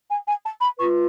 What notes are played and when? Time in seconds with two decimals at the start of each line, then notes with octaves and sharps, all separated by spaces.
0.10 G#5
0.27 G#5
0.43 A5
0.61 B5
0.78 B4 C#6
0.81 F4